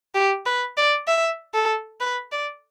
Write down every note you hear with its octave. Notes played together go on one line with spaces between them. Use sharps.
G4
B4
D5
E5
A4
B4
D5